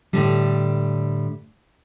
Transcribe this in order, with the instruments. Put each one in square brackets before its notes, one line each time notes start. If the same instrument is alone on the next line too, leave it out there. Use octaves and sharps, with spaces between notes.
[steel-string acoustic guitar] A2 D3 G3